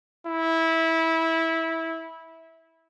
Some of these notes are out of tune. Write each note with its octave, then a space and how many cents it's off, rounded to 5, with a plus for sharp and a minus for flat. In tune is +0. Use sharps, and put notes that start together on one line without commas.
E4 -15